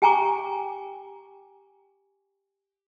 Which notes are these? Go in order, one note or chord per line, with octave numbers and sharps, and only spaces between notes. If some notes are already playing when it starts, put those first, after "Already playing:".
G4 G5 G#5 A#5 C#6 D6